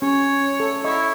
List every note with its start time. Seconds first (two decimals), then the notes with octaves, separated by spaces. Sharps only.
0.02 C#4 C#5
0.60 A4
0.84 E4 D#5 C#6